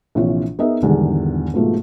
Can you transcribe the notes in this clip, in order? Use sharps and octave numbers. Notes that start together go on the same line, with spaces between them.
A#1 C3 E3 F4 C#5
B3 D#4 G#4 A#4 D#5 E5
E1 E2 G#2 D3 D#3 G3
G#2 B2 F3 A3 A#3